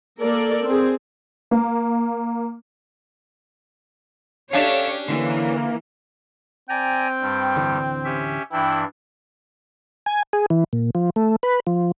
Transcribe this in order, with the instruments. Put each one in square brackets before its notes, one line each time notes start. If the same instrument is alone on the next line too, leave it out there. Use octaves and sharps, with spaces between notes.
[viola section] A#3 A4 A#4 D5
C4 G#4
[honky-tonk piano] A#3
[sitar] C#4 D4 [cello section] G4 C#5 [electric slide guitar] A4 E5 F5
[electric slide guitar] D3 [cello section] E3 [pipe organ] A#3
[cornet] C4 [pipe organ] D5 G#5 A#5 [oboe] G5
[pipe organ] G2 G3
[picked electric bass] D1 D3 E3
[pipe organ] C#4 G4 E5
[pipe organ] G2 E3 D4 [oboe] E4 [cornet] G5
[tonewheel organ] G#5
G#4
E3
A#2
F3
A3
B4
F3